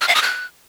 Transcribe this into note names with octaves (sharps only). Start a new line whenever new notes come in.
F6
F5
D#6
F#6